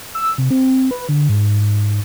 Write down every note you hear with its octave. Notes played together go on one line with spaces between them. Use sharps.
E6
C3
C4
B4
D3
G#2